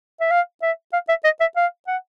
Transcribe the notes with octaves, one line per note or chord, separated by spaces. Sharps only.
E5
F5
E5
F5
E5
D#5
E5
F5
F#5